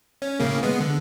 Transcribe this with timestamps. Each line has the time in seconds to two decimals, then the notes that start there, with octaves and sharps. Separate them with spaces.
0.22 C#4
0.40 A2 C#3 A#3
0.63 G#3 B3
0.81 D3